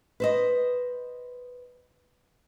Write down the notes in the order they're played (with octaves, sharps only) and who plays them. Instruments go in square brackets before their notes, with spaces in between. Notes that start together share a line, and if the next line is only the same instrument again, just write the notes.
[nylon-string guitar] B4 C5 D#5